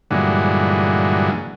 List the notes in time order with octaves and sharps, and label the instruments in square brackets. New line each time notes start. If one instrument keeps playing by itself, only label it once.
[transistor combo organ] G2 A#2 D3 E3 F#3 G#3